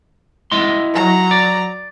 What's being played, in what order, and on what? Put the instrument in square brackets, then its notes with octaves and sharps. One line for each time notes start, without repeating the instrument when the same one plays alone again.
[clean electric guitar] E4 D#5 C6
[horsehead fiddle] F#3 A#5
[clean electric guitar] D5